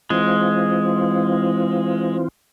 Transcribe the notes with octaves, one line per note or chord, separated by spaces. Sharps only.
E3 G#3 C4 F4